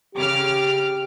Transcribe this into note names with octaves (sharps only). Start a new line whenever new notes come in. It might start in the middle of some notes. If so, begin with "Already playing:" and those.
C#3 G4 D6 F6